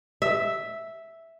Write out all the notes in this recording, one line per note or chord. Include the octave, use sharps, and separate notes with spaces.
E5